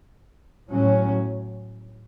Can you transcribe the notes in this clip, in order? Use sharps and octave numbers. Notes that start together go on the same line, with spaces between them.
A2 F#3 C#4